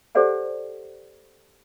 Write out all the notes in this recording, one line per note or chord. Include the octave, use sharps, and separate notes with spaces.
G4 A4 C5 D5 F#5 G#5